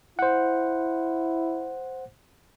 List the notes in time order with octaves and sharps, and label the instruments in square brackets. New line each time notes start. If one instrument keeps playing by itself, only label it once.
[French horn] E4 [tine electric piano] C5 F#5